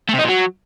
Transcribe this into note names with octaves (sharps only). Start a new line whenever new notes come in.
A3
C3
D#4
A#2
F#3